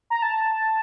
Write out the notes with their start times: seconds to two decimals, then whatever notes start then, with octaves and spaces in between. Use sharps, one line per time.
0.10 A#5
0.22 A5